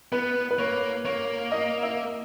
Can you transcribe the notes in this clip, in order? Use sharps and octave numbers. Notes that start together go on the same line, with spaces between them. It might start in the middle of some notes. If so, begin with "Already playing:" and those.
B3 B4
B4
A#3 C#5
A#3 C#5
D#5
E5